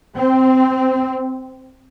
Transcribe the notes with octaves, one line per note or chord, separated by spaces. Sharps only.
C4